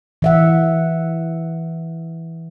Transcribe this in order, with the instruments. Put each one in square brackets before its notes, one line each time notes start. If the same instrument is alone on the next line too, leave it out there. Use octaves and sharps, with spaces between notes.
[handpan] E3 E5 F#5